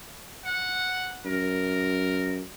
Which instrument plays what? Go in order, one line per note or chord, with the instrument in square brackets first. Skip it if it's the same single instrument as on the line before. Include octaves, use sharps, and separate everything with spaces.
[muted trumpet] F#5
[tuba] F#2 [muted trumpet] A#4